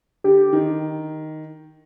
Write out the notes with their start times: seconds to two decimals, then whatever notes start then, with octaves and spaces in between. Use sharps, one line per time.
0.24 D3 G4
0.53 D#3